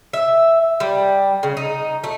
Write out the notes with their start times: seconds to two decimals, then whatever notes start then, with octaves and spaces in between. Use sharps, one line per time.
0.13 E5
0.80 G3
1.43 C#3
1.57 D#4
2.04 A3